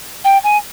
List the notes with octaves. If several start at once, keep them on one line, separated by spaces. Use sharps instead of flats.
G5
G#5